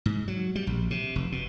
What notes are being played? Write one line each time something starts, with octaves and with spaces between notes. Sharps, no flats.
G#2
F#3
G3
A#1
C3
F1
B2